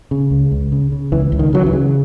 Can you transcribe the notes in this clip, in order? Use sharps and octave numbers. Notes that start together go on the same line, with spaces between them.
C#3
C#2
C#2
C#3
C#3
C#2 E3
C#2
D#3
C#3 F#3
E3
C#3